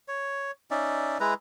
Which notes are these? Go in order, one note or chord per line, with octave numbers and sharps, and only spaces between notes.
C#5
C#4 D#4 D5 E5
G#3 E4 B4 A#5